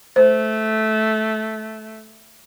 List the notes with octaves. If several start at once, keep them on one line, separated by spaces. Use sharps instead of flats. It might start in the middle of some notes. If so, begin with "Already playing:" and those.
A3 C5